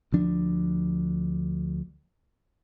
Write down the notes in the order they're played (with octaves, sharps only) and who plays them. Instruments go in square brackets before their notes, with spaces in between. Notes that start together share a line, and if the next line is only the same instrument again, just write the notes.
[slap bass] D2 F3 D4